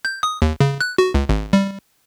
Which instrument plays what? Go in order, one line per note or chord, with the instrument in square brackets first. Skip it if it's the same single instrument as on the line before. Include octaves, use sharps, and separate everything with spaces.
[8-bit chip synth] G6
D#6
D#2
C#3
F#6
F#4
C#2
G#1
G3